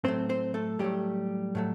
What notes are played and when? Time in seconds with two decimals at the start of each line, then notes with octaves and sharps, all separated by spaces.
0.04 A2 F#3 A3 C4 C5
0.29 C4 C5
0.54 A3 A4
0.79 A2 F#3 G3 A3 G4
1.55 A2 F#3 A3